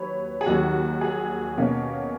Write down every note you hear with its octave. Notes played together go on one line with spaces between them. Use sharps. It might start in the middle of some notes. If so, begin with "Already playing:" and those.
Already playing: D#2 F#3 B4 C#5
G#4
D#2 D#3 F#3 F#4
G#4
B2 A#3 C#4